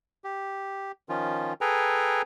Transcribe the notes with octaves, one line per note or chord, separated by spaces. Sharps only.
G4
D#3 F3 C#4 F4
G#4 A4 B4 G5 G#5 A#5